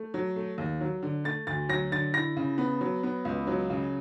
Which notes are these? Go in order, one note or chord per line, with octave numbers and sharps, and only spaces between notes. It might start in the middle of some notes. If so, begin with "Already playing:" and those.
Already playing: A3
F#3
A3
D#2
F#3
D3
A3 A6
D2 A6
F#3 A#6
D3 A6
E4 A#6
C#3
B3
F#3
B3
C#2
F#3
C#3